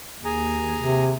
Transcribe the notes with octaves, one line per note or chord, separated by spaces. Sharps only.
D#2 G#4 G#5 A#5
C3